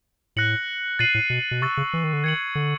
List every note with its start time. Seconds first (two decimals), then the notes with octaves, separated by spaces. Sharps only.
0.36 A2 F#6 A#6 C#7 F#7
0.99 A#2 A6 C7 D#7 F#7
1.15 A2
1.30 B2
1.51 B2
1.61 C3 C#6 E6 A6
1.77 C#3
1.93 E3
2.04 D#3
2.13 D3
2.24 D#3 G#6 C#7 F#7
2.55 D3